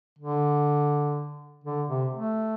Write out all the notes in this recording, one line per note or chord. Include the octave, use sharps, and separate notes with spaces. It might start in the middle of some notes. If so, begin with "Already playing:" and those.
D3
D3
C3
A3